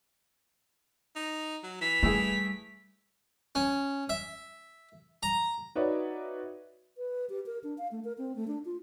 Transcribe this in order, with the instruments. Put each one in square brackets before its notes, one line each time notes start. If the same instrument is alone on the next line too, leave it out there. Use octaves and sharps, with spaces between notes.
[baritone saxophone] D#4
F#3
[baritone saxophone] E3 [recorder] B6
[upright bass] G3 [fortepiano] A3 E4 G#4
[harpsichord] C#4
E5
A#5
[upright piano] D#4 F#4 B4 C#5 D5 E5
[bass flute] B4
G4
A#4
D4
F5
A3
A#4
C4
A3
D4
F4